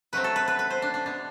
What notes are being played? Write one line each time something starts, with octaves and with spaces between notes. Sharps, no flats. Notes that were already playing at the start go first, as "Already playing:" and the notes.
B2 F#3 A3 C4 B4
A4
B4
B4
B4
C5
D4
D4
B2 G3 B3 D4